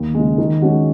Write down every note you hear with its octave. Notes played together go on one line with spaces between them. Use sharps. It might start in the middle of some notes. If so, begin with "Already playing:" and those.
Already playing: D#2
C#3 G#3
D#3
G#3 C#4 F#4